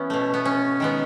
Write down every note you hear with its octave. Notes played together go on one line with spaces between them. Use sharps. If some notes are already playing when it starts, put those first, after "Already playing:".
Already playing: E3 B3 C#4 E4
B2 A3
B3
C#4
D#3 G#3 B3